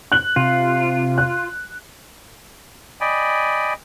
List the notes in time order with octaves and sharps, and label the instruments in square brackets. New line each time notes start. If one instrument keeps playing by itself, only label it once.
[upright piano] F#6 F#7
[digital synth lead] C3 [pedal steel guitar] F4
[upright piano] F#6
[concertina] D5 D#5 G5 G#5 B5